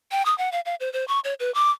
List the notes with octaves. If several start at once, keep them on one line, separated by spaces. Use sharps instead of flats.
G5
D#6
F#5
F5
F5
C5
C5
C#6
C#5
B4
D6